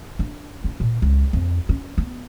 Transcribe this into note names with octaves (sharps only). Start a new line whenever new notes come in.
D4
C#4
A#2
C#2
F2
C#4
B3